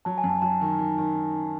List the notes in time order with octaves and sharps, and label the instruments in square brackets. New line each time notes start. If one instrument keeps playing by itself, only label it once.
[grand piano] F#3 [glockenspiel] A5
[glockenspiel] G#5
[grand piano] F#2
[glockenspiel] A5
[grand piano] F#3 [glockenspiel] A5
[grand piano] D#3
D#3
D#3